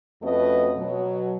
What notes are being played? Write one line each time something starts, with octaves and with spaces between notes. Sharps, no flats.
F2 A3 C#4 F#4 B4 D#5
B2 F#3